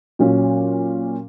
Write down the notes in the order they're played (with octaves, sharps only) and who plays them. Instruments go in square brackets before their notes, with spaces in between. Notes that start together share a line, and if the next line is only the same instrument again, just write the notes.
[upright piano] A#2 F#3 C#4